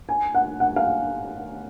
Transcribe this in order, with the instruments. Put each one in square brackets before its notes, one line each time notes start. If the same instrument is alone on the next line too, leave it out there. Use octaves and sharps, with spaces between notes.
[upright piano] G#5
F#5
F#5
F5